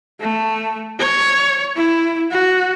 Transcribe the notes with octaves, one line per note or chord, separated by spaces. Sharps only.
A3
C#5
E4
F#4